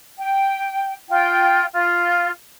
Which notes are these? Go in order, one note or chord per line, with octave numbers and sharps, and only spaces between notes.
G5
F4 G5
F4